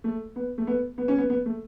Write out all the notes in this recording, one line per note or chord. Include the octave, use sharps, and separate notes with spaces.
A3
B3
A3
B3
B3
C#4
B3
B3
A3